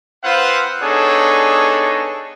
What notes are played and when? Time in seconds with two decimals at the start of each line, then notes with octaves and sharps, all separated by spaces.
0.24 C4 F4 B4 C5 F5 F#5
0.83 B3 D4 D#4 G#4 A4 C#5